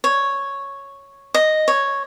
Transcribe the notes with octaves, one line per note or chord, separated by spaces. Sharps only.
C#5
D#5
C#5